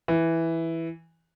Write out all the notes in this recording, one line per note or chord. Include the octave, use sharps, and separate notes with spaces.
E3